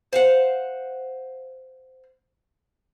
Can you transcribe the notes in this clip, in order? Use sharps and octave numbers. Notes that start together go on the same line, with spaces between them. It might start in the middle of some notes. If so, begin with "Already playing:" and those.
C5 F5 F#5